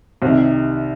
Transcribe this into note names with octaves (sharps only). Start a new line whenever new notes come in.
C2 C3 D#3